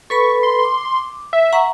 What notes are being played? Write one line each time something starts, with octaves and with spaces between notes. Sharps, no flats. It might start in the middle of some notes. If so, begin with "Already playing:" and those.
A4 B4 B5 C#6
C6
D6
E5
F#5 A#5 C#6